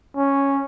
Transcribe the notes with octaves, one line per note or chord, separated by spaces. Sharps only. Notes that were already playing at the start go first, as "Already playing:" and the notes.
C#4